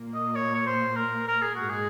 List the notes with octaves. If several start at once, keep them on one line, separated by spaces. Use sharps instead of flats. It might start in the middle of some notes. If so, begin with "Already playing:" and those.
Already playing: A#2 A#3
D#5
C#5
C#5
C5
A#4
A#4
G#4
G#2 G#3 F#4
G#4